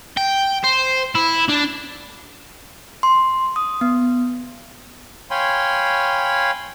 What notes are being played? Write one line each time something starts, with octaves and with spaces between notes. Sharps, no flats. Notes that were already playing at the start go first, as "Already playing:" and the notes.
G5
C5
E4
D4
C6
D#6
B3
C#5 F5 G5 G#5 B5 C6